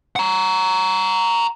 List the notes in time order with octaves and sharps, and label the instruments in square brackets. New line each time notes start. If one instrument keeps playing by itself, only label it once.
[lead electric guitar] F#5 A#5